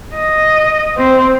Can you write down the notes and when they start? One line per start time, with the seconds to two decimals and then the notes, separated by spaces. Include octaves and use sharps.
0.15 D#5
0.97 C4